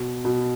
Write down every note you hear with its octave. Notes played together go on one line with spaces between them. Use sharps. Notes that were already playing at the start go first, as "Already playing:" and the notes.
Already playing: B2
B2